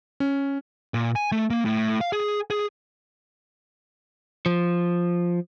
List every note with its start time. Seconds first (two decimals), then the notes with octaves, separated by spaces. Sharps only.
0.20 C#4
0.94 A#2
1.16 G#5
1.32 A3
1.50 A#3
1.65 A2
2.01 F5
2.13 G#4
2.50 G#4
4.46 F3